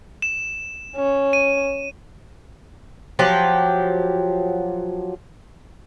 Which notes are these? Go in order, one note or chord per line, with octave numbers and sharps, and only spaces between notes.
E7
C#4
D#7
F3 F#3 G4